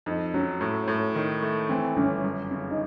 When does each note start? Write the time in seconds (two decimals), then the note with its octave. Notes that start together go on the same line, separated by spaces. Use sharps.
0.06 F2 D#4
0.34 F#3 C#4
0.61 A2
0.88 A2
1.15 D#3
1.42 A3
1.69 E3 C4
1.97 G1 C#4
2.24 F#2
2.51 C#3
2.71 D#4